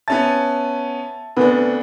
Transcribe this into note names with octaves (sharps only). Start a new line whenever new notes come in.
B3 C#4 E5 A5 A6
D2 B3 C4 D4 A4